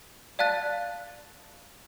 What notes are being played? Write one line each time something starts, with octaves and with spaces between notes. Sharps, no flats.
D5 F5 A5 F#6 A6